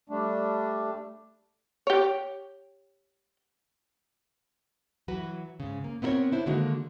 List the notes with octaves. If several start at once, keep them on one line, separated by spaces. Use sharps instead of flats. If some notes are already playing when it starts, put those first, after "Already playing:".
G3 A3 D4
G4 C#5
E3 F#3 F#4 B4
G#2 C#3
A#3
B3 C4 E4 G#4 A#4 C#5
D4 E4 C5
D3 D#3 G#3 A#3 F#4